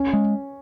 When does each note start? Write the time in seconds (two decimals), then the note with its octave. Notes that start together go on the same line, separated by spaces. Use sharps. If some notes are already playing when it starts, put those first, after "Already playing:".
Already playing: C#4
0.13 G#3